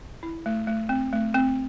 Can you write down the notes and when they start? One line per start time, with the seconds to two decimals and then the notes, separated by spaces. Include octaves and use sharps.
0.23 E4
0.46 A3
0.67 A3
0.89 C4
1.13 A3
1.34 C4